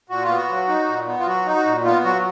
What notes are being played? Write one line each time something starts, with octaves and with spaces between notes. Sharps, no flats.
A#2 F#4
F4
B3
F#4
F#3
D#4
A#2
B3
F4
F#3 F#4
D#4
F#4
A#2
B3 F4
F#3 F#4